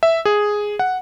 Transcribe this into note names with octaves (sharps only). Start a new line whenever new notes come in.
E5
G#4
F#5